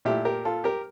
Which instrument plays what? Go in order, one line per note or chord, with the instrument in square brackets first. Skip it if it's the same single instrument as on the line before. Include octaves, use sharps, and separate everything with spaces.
[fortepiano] A#2 A3 E4 G4
G4 A#4
F4 A4
G4 A#4